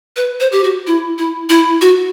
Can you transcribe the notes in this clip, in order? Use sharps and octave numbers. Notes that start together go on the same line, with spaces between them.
B4
C5
G4
F#4
E4
E4
E4
F#4